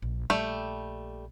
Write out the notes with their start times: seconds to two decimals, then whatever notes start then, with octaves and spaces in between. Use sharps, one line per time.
0.02 A#1
0.30 A#1 G3 A3 G5